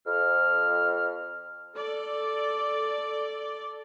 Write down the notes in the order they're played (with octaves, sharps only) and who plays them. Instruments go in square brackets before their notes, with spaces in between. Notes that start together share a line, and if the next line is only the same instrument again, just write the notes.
[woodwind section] F2 F6
[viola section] A4 D5